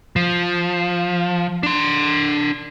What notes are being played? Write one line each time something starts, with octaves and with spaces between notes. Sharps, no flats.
F3
D4 C6